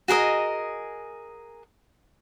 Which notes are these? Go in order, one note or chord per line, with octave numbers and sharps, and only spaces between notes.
F#4 G#4 A#4 D#5